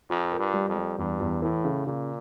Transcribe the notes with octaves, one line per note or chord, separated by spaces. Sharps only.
F2 F4
A#4
G2
G3
F2
G3
E2 G2
E2
A2 E3
C#3
A#2 C#3